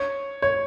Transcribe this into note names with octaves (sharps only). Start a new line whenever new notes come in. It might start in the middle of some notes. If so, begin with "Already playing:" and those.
Already playing: C#5
C#5